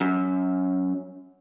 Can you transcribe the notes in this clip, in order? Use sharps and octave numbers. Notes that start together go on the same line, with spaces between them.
F#2